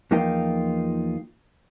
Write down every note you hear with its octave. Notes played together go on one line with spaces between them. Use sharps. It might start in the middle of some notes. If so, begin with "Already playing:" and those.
E2 F3 A#3 D#4 F4 G5